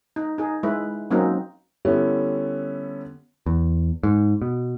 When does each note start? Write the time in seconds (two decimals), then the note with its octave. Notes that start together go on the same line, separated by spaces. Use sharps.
0.16 D#4
0.38 D#4 G#4
0.63 G#3 E4 B4
1.11 F#3 A#3 C4 C#4 D#4 F#4
1.85 D3 G3 B3 C#4 E4
3.46 E2
4.03 G#2
4.42 B2